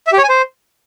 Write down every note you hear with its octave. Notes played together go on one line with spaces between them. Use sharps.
E5
G4
C#5
G#5
C5